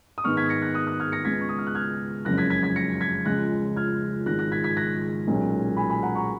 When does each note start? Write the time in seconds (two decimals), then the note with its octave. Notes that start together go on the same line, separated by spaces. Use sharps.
0.18 D#6
0.24 G#2 D#3 G#3 B3 C#6 F6
0.37 G#6 B6
0.49 A#6 C#7
0.62 F#6 A#6
0.74 D#6 F#6
0.87 D#6 F#6
1.00 F6 G#6
1.12 A#6 C#7
1.25 C#2 C#3 G#3 B3 G#6 B6
1.41 C#6
1.49 D#6
1.58 F6
1.67 F#6
1.75 F6 G#6
2.25 F#1 F2 C#3 G#3 C#4 F#6 A#6
2.38 G#6 B6
2.50 G#6 B6
2.63 G#6 B6
2.76 A#6 C#7
3.01 G#6 B6
3.25 C#2 C#3 F3 G#3 F#6 A#6
3.76 F6 G#6
4.26 G#1 G#2 F3 G#3 F#6 A#6
4.39 F#6 A#6
4.52 G#6 B6
4.64 G#6 B6
4.76 F#6 A#6
5.27 B1 A#2 G#3 C#4
5.77 G#5 B5
5.90 G#5 B5
6.03 F#5 A#5
6.15 A#5 C#6